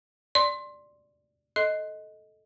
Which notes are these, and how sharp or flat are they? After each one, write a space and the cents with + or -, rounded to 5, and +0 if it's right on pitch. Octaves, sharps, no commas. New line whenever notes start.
D5 +0 C6 +15
A4 -10 D#5 +10 C6 +0